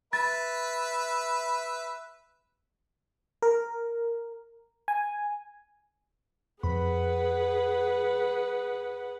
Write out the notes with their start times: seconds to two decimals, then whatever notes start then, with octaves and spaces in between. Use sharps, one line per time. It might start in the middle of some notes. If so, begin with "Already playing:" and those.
0.13 B4 E5 A6
3.42 A#4
4.88 G#5
6.63 F2 G#4 B4 F#5 B5